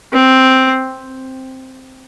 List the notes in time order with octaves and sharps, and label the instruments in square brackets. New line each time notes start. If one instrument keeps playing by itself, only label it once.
[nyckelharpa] C4